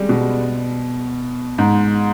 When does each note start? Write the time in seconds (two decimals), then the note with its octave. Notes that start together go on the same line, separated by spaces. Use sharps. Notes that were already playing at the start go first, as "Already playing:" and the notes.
Already playing: G3 G#3 C4
0.09 B2
1.58 G#2